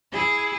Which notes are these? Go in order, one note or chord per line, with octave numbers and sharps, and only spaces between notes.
E4 G#4